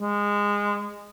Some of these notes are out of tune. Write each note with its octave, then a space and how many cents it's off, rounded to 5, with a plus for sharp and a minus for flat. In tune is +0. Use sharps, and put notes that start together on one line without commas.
G#3 -20